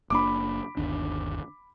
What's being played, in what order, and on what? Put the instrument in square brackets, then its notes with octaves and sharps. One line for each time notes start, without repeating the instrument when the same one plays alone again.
[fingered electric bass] F#1 A#3 D4 [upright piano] B5 D6
[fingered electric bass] G1 D#2 D4